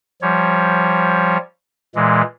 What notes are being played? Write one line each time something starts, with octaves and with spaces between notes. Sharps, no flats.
F3 G3 C#5
A#2 E3 G#3